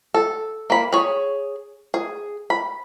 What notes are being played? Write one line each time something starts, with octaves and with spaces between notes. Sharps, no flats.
A4
A#3 B5
G#4 C#5
G#4
B5